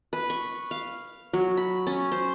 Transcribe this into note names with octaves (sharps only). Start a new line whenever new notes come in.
B4
C#6
F5
F#3
B5
C#4
C5